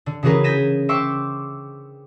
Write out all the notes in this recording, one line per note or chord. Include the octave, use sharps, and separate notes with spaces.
D3
C#3 E3 F#4 G#4 A#4 B4
G6 G#6 A#6 B6 D#7 E7
C5 E5 G5 C#6 D6 E6